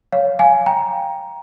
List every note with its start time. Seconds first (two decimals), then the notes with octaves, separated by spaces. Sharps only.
0.12 C#5 F5
0.39 F5 G#5
0.66 G5 A#5